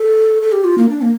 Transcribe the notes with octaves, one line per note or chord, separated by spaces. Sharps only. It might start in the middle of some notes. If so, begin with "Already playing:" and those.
Already playing: A4
A4
G4
F4
A#3
D4
A#3